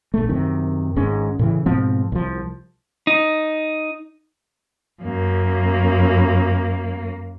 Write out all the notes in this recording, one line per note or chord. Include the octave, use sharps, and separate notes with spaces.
A#1 A3
F#2 C3 D#3
G#1 G#2 G#3 C#4
A2 C#3 E3
G#2 B2 F3 C4
C2 F3
D#4
F#2 A#3